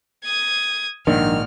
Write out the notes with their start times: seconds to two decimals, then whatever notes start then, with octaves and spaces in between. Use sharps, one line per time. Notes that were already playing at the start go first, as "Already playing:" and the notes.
0.25 D#6 G#6
1.07 A#1 G#2 D#3 F3 D4 F6